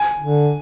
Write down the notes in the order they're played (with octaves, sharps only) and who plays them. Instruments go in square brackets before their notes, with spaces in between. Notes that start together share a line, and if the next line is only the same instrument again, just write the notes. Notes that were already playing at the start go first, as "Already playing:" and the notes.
Already playing: [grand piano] G#5
[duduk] D3